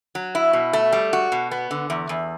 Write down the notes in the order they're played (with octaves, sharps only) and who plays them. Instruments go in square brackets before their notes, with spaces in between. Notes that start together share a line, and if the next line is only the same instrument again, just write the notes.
[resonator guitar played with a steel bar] F#3
E4
B2
A3
G3
F#4
B2
B3
D3
E2
E2